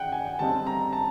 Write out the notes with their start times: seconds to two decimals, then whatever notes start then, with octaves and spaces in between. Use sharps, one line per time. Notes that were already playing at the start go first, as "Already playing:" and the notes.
Already playing: F#5 G5
0.12 G#5
0.39 D3 G3 C4 D#4 A5
0.67 A#5
0.93 A5